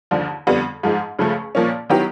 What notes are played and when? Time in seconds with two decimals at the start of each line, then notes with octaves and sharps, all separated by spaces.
0.11 D#2 D3 F3
0.47 F2 D3 G3 B3
0.83 G#2 F3 G#3
1.19 C#2 C#3 F3 A3
1.55 A#2 F3 A#3 C#4
1.90 D#3 F#3 B3 E4 G4